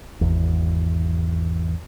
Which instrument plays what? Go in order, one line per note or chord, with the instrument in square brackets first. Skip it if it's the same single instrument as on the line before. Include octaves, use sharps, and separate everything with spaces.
[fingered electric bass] G#1 E2